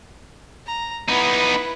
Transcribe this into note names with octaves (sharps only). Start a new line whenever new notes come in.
A#5
B3 D#4 E4 B4